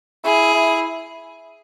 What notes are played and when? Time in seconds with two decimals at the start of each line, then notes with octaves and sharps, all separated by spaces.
0.24 E4 G#4
0.54 E4